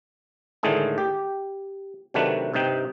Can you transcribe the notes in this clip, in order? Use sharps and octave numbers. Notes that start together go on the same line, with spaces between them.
A2 D3 D#3 G#3 A3 G#4
G4
C3 D#3 F#3 A3 D4 B4
G2 C3 D#4 G5